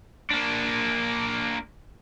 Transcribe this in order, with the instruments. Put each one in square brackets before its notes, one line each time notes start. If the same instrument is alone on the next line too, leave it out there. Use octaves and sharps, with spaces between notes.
[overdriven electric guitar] A#3 D4